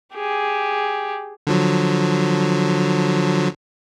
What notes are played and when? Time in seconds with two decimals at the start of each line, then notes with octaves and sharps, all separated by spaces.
0.14 G4 G#4
1.47 D3 F3 F#3